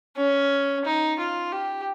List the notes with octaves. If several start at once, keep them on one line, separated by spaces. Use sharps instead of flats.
C#4
D#4
F4
G4